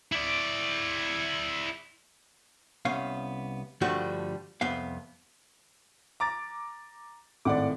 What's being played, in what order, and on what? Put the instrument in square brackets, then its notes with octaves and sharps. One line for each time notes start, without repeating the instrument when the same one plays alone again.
[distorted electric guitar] E4 D5
[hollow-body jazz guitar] C2 B3 C#4 F5
G2 D3 F3 G3 A3 F#4
C2 F2 B3 F5
[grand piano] A#5 D6 A6
[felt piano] G#1 A2 [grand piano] D5 F#5 D6